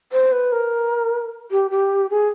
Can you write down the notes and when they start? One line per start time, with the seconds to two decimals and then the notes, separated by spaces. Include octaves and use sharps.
0.12 C5
0.32 B4
0.52 A#4
1.51 G4
1.71 G4
2.10 G#4